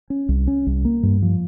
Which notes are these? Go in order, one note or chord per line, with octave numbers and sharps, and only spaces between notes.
C#4
C2
C#4
C2
A#3
G2
F3